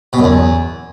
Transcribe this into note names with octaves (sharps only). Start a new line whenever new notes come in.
B2
F#2
E2